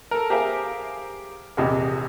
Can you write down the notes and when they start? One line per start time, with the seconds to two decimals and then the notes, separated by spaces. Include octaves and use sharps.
0.11 A4 A#4
0.30 G4 G#4 A#4 C5 E5 F5
1.57 A#1 E2 C3 D#5